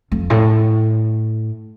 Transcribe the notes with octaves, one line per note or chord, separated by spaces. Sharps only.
F2
A2